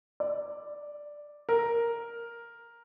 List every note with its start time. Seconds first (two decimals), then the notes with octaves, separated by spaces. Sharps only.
0.20 D5
1.49 A#4